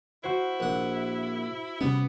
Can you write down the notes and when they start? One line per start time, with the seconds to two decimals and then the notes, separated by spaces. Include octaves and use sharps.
0.23 E4 F#4 C5
0.60 A#1 F#5
1.81 C3 G3 B3 C#4